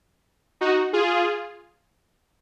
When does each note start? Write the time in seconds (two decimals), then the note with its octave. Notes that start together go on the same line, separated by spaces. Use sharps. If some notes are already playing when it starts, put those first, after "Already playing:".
0.61 D#4 F#4
0.93 F4 G#4